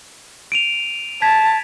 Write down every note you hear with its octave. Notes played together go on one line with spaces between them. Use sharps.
D7 D#7 F7
A5 G#6 B6